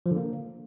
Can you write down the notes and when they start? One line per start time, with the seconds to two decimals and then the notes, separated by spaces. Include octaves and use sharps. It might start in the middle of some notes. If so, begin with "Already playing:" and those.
0.06 F3
0.11 D3
0.17 A#3